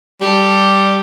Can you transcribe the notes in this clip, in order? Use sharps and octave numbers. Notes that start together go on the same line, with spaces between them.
G3 G4 A4